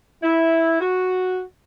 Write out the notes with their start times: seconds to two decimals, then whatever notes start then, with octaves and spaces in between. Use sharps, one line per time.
0.23 E4
0.81 F#4